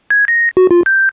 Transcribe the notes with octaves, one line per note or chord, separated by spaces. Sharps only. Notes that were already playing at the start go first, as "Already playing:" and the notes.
G#6
A#6
F#4
F4
G6